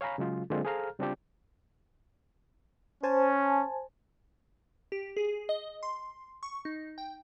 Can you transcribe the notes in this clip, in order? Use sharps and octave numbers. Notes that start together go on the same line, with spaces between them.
C#5 F5 G#5 A#5 B5
C#3 F#3 G#3 F4
D3 F#3 G#3 A#3 C4 F4
G#4 A4 C5 F5 A#5 F6
C#3 G3 C4 D4 F4 G4
C#4 C5 G#5 A5
G4
G#4
D#5
C6
C#6
D#4
G5